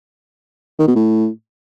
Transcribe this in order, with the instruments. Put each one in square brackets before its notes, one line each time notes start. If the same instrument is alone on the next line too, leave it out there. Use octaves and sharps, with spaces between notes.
[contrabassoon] D#3
B2
A2